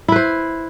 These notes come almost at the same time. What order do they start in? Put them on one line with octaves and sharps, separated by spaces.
E4 B4 C5